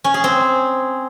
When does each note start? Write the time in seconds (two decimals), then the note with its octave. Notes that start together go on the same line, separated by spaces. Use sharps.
0.04 C#4
0.14 G#4
0.24 C4